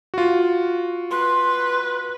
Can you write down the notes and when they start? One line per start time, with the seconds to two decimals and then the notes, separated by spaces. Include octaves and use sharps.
0.14 F4 F#4
1.11 B4 C6